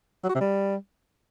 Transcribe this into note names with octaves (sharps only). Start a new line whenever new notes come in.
F#3
F#4
C3
G3